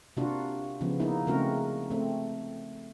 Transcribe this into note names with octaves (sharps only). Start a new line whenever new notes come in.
C3 A#3 D4 F4 F#4
C#3 F3 B3
A#3 B3 D#4 E4
C#3 G#3 A3 C4 F#4 A#4
A3 C4